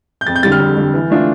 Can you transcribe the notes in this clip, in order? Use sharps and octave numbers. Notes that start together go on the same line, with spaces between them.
G6
F2 A6
G6
D3 G3 A6
F6
F2
D3 G3
E3
A3 D4 F4